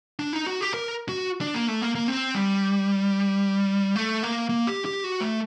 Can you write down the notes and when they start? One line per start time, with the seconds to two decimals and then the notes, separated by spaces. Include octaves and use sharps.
0.19 D4
0.33 D#4
0.47 F#4
0.61 G4
0.74 A#4
1.09 F#4
1.41 D4
1.54 A#3
1.68 A3
1.81 A#3
1.95 A#3
2.08 C4
2.35 G3
3.96 A3
4.23 A#3
4.49 A#3
4.67 G4
4.85 G4
5.04 F#4
5.21 A3